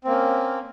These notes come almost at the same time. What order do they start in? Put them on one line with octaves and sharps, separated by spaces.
C4 A#3 C#4